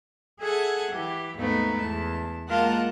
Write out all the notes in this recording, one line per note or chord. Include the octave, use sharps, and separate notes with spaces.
G#4 A4 E5 F#5 G#5
E3 G4
D#2 G#2 A3 B3 D#4
E2 A5
G#3 A#3 F4 A#4 F#5 A5